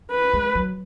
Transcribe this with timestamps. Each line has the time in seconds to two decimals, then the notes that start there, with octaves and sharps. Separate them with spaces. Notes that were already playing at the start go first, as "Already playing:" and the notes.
0.11 B4
0.33 G#3
0.55 F#3